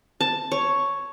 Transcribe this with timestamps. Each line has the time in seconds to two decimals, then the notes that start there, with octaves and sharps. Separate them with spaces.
0.21 A5
0.52 C#5